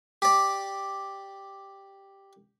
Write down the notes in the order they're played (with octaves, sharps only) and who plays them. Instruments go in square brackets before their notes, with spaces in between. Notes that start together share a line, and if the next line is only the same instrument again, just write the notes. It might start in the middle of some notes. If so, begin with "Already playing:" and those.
[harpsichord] G4 D5